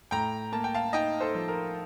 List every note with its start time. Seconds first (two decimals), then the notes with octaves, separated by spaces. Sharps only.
0.11 A2 G5 A#5
0.52 A#3 A5
0.64 G5
0.74 F5 A5
0.93 D#4 D#5 G5
1.20 A4 C5
1.35 F3
1.48 A#4